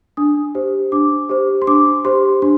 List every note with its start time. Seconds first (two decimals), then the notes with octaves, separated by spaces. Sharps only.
0.17 D4 D#6
0.55 G4 C5
0.92 D4 D6
1.29 G4 C5
1.62 C6
1.67 D4 D6
2.05 G4 C5 C6
2.42 D4 C6